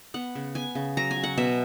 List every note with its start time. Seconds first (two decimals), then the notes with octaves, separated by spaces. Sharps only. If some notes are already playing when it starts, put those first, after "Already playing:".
0.14 B3 F#5
0.35 C#3
0.55 B3 G#5
0.75 C#3
0.97 F#3 A#5
1.11 G#5
1.16 F#3
1.23 F#5
1.37 B2 E5